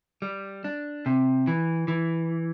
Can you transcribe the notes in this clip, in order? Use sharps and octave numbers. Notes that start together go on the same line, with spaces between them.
G3
D4
C3
E3
E3